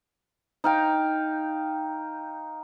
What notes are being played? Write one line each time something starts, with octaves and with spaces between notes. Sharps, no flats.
D#4 F5 G5